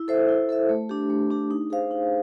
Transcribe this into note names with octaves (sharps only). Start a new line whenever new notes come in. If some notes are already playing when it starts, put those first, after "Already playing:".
Already playing: E4
A4 C5 E5
E4
A4 C5 E5
A3
D4 G4
A3
D4 G4
D#4
G#4 C5 F5
D#4